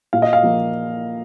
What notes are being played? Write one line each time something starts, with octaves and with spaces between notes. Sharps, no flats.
A#2 F5
D#5
F5
F3 A#3